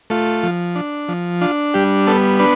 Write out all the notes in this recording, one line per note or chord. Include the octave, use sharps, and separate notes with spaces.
A3 F4
F3
D4
F3
D4 F4
G3 G4
B3 A4
D4 B4